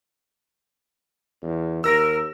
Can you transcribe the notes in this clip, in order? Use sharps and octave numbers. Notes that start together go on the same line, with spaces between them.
E2
D#2 A#4 E6 A#6